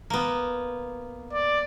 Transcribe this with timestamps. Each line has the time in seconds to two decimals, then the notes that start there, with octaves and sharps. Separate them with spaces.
0.10 A#3 B3
1.33 D5